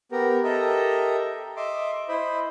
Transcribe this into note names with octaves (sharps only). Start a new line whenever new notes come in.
B3 G4 A#4
G4 A4 A#4 D#5 E5 A#5
D#5 E5 C6 D6
E4 C5 D#5 B5